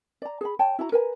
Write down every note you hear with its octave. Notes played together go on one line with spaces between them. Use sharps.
D5 A#5
G#4 A4 B5
C#5 G5 A5
E4 F#4 A#5
A#4 B4 G#5 A#5